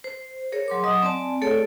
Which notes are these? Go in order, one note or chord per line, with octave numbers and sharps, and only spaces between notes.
C5
G#4 A#4 C#5
F#3 C6 D6
F#3 D#5 D#6
C4 D5 G#5 A5
A3 G#4 A4 C#5 D5